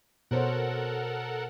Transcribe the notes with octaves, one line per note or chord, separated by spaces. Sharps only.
B2 A4 A#4 C5 C#5 F#5